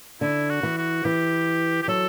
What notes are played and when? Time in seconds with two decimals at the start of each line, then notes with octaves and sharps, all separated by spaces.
0.21 D3 E4
0.50 F#4
0.63 E3
0.78 F#4
1.05 E3 G4
1.82 G4
1.88 F#3 A4